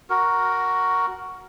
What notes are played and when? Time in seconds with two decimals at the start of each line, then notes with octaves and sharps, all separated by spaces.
0.10 F#4 A#4